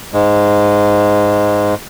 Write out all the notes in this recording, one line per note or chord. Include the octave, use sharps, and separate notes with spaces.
G#2 G#3